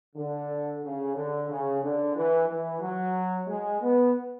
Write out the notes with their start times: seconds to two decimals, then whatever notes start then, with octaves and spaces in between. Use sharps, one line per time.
0.16 D3
0.83 C#3
1.15 D3
1.49 C#3
1.82 D3
2.15 E3
2.48 E3
2.82 F#3
3.48 G#3
3.81 B3